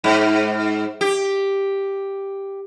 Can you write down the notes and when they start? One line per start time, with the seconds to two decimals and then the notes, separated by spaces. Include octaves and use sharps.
0.04 G#2
1.01 G4